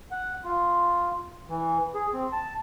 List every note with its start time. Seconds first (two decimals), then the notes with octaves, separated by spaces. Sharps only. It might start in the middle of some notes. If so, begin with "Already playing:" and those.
0.11 F#5
0.44 F4
1.49 E3
1.95 G#4
2.13 C4
2.33 A5